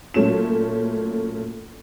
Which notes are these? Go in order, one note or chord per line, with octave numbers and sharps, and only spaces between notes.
A#2 F#3 A3 C#4 E7